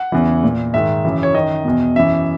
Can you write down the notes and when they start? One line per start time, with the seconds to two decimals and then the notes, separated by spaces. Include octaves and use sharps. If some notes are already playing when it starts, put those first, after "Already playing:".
Already playing: F#5
0.12 E2 C#3 E3
0.44 A#2
0.74 G#2 D#3 E5
1.05 F#2 C#3 E3
1.23 C#5
1.34 F#2 D#3 D#5
1.65 E2 B2
1.96 F#2 E3 E5